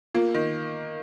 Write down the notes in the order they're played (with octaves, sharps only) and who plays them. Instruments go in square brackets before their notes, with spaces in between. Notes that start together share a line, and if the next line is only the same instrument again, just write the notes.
[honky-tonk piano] A#3 [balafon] F4
[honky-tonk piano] D#3